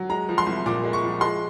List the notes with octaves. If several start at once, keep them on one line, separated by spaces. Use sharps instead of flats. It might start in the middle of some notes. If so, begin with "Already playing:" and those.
Already playing: F#3
G#3 A#5
F3
C6
C2
A#2 D6
G#3
C#6
F3
G#3 C6